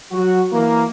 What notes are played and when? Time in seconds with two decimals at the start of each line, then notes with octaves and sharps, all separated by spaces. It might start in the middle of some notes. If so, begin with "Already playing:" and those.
0.12 F#3 F#4
0.53 E3 A#3